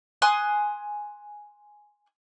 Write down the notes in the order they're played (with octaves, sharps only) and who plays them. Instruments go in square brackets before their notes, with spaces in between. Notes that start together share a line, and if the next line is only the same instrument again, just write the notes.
[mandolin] G#5 C6 D#6 F#6